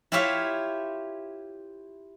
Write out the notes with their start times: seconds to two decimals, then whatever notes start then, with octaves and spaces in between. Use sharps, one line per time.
0.12 E4 F4 G4 C#5 E5 F5